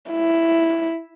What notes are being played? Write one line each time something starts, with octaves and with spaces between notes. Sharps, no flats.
E4